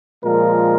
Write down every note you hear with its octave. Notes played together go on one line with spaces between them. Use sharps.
A#2 F3 G#3 A#4